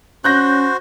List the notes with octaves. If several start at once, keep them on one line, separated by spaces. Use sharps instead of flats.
C#4 F#4 C5 F#6 G6 A#6